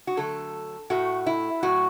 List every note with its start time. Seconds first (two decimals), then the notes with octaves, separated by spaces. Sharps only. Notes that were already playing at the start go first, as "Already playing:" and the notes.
0.07 F#4
0.17 D3 F#3 A3 A4
0.90 A2 A3 F#4
1.27 E4
1.63 A2 F#3 A3 F#4